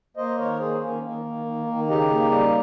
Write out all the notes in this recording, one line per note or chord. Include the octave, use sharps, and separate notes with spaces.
A#3 C5 D#5
D#3 A#4 C#5
A#3 G#4 C5
D#3 A#3 C#4
D#3 A#3
D#3
D#3
D#3
C#3 D#4 G4
A#3
G3